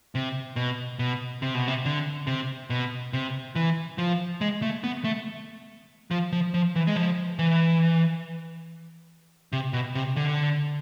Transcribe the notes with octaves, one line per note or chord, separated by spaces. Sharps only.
C3
B2
B2
C3
B2
C3
D3
C3
B2
C3
E3
F3
G#3
A3
B3
A3
F3
F3
F3
E3
G#3
F3
E3
C3
B2
C3
D3